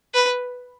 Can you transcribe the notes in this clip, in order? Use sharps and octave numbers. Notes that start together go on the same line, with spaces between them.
B4